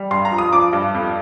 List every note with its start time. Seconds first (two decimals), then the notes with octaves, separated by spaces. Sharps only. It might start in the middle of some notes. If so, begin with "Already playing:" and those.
Already playing: G3
0.11 G2 C6
0.25 A#5
0.32 F3
0.38 D#6
0.53 F3 D6
0.73 G2
0.95 F2